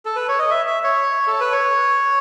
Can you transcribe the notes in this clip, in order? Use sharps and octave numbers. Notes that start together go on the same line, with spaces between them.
A4
B4
C#5
D#5
E5
E5
C#5
A4
B4
C#5